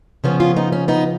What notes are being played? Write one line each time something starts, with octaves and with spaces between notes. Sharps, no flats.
C#3 F3 B3 C#4
C#4 F4
B3 D#4
C#4
B3 D#4